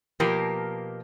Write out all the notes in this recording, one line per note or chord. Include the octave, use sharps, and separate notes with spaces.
B2 F3 A#3 G4 A#4